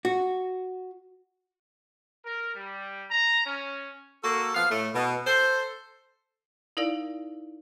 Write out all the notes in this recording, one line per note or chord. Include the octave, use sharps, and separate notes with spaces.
F#4
A#4
G3
A#5
C#4
A#3 F#4 A4
F3 B3 F5
A2 A3
B2
A4 C5
D#4 E4 A#4 D5 F5